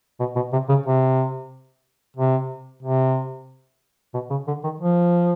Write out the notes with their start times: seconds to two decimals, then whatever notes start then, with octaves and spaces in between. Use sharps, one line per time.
0.20 B2
0.36 B2
0.53 C3
0.69 C#3
0.86 C3
2.17 C3
2.82 C3
4.14 B2
4.30 C#3
4.47 D3
4.63 D#3
4.80 F3